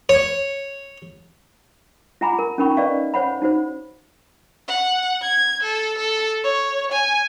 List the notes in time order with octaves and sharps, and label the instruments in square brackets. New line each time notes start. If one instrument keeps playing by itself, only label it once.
[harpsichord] C#5
[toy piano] F4 F#5 G#5 A#5 B5 D6
A#4
C#4 D#4 A#4 G5 B5 C#6
C#4 B4 D5 D#5 F5 C#6
C5 C#5 F#5 B5
D#4 F#4 C5
[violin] F#5
G#6
A4
A4
C#5
G#5